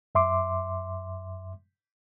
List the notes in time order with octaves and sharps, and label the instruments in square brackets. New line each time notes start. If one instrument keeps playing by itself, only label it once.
[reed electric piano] F#2 E5 C6 D6